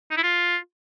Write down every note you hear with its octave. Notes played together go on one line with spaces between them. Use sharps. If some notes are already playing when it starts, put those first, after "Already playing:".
D#4
E4
F4